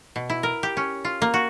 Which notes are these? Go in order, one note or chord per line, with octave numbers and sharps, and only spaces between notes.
B2
E4
A#4
G4
C#4
F4
A#3
F#4